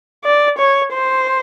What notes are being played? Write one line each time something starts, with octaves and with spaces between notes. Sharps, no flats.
D5
C#5
C5